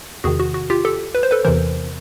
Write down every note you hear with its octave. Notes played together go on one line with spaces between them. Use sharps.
E2 C3 D#3 F#4 G#4
F#4
F#4
F4 G4
G4 A4
B4
C5
A4 B4
E2 C3 E3 A#4 C5